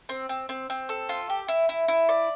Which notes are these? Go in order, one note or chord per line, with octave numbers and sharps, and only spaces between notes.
C4
C4
C4
C4
A4
F4
G4
E4
E4
E4
D5